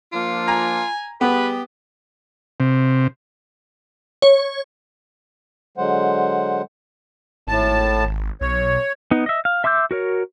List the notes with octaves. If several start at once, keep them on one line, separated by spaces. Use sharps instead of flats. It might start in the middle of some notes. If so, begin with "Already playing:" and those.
F3 A#3 D4 F4
G#5 A#5
G3 B3 G4 G#4 B4
C3
C#5
D3 F#3 G#3 C5 F#5
G#1 A2 A5
B1 C#5
B3 D#4
D#5 E5
F5
E5 C6 D6 E6 G6
F#4 A#4 C#5